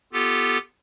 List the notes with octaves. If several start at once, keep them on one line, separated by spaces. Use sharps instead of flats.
B3 F4 G4 A4